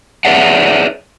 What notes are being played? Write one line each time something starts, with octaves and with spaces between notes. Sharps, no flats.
G#4 B4 C#5 D5 E5 F#5